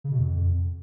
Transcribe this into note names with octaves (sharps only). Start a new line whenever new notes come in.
C#3
B2
F2